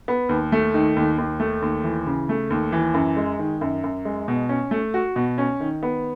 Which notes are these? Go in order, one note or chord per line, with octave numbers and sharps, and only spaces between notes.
B3
D#2
A3
D#3
D#2
D#2
A3
D#2
E3
C#3
A3
D#2
E3
F#2
G#3
D#3
F#2
F#2
G#3
B2
C#4
A3
F#4
B2
C#4
D#3
B3